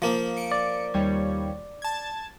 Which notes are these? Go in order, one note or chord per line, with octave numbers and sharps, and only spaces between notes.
F3 A#3
C#7 D7
D5
D#2 G3 C#5
A5 G#6